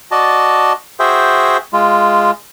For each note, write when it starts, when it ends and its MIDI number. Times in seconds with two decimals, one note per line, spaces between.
0.11 0.73 66
0.11 0.73 74
0.11 0.73 75
0.11 0.73 81
1.00 1.57 66
1.00 1.57 68
1.00 1.57 72
1.00 1.57 76
1.00 1.57 79
1.73 2.31 56
1.73 2.31 65